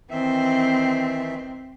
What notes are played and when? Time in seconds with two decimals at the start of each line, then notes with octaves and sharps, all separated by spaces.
0.11 D#3 E3 C4 E5